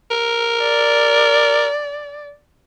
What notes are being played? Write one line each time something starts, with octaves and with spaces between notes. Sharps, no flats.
A#4
D5